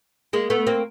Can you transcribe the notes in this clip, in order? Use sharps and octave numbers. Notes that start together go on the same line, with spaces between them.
G#3 A#3
A3 B3
A#3 C4